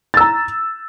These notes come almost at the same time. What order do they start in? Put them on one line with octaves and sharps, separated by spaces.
A6 E6 A#5